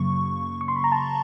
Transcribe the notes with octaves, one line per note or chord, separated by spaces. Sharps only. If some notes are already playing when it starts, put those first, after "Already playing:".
Already playing: F#2 C#3 F#3 A#3 C#6
C#6
C6
B5
A#5
A5